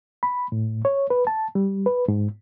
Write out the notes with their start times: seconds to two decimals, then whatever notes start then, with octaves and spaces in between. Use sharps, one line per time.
0.23 B5
0.52 A2
0.85 C#5
1.10 B4
1.27 A5
1.55 G3
1.86 B4
2.08 G#2